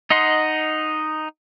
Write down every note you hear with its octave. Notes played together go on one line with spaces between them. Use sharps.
D#4 D#5 F#5 C6